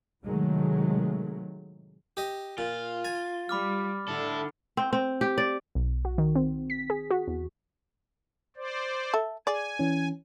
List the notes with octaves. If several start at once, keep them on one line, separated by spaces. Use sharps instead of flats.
A2 C3 D#3 F#3 G#3 A3
G4 D#5
A#2 F4
G#5 A6
G3 B5 D6 F6
D3 E4 A4
C4
C4
G4
D5
B1
F#4
D#3
C4
B6
G#4
F#4
E2
C5 D5
A4 E5
G#4 D5 G#5
E3 C#4